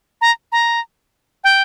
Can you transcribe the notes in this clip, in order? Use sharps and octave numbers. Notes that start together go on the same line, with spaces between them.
A#5
A#5
G5